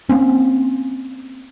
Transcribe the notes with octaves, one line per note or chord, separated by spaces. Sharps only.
A#3 C4 C#4